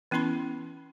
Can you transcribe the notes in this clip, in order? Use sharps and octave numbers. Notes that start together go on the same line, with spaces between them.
E3 B3 C#4 E4 B5 C6